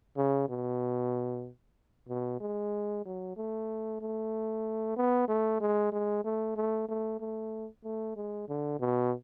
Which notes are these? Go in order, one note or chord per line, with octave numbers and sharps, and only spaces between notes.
C#3
B2
B2
G#3
F#3
A3
A3
B3
A3
G#3
G#3
A3
A3
A3
A3
A3
G#3
D3
B2